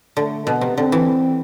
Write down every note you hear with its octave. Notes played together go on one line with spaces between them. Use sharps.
D3 A3
B2 B3
C3
D3 C4
E3